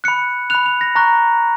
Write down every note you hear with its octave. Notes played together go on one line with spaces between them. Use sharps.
B5 F#6 C#7
B5 F#6 F7
F7
A#6
A#5 C#6 F#6 A#6